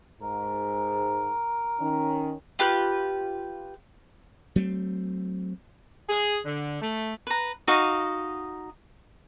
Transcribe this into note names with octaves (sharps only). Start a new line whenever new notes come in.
G#2 A#4
D#3 C#4
F4 G4 B4 F#6
F#3 A3 B3 C4
G#4
D3
A3
B4 A#5
D#4 F#4 D#5 F5